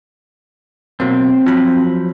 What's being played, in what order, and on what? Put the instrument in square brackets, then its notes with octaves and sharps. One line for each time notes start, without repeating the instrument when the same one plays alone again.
[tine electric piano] B2 F#3 A#3 [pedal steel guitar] C4
[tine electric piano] F3 F#3 B5